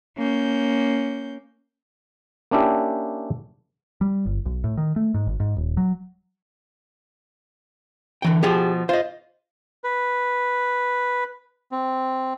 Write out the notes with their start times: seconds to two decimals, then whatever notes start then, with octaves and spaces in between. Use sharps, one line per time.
0.17 A#3 C#4 G6
2.51 A#3 C#4 D4 E4 G4
4.01 G3
4.26 G1
4.46 B1
4.64 A2
4.77 D#3
4.96 A3
5.14 G#2
5.27 G#1
5.40 G#2
5.56 D#1
5.77 F#3
8.22 D3 E3 G5
8.43 B2 F3 G4 G#4
8.89 F4 C5 D#5
9.84 B4
11.72 C4